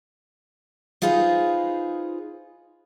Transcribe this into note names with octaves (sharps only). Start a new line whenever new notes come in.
D#4 F4 G#4 B4 C5 D#5